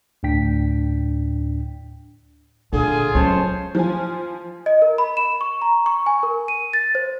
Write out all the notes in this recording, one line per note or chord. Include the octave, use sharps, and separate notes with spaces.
D2 A2 D4 G5 B6
A#2 D3 F4 G#4
C#2 F#3 C#4 C5 C#5 A5
F3 F4 G#5
D#5
A#4
B5
E7
C#6
A#5
C#6
G#5
A#4
D#7
A6
C5